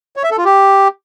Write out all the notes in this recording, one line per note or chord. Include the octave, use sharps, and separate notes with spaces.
C#5
E5
A4
F4
G4